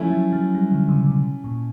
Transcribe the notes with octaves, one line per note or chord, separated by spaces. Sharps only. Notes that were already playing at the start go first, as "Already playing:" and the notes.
Already playing: F3 A3 C#4 E4
F#3
F#3
G3
D3
C#3
B2
A#2